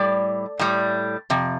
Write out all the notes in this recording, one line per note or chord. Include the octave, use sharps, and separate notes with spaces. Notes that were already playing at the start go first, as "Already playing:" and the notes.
Already playing: A2 G3 D5
A2 G3
F2 C3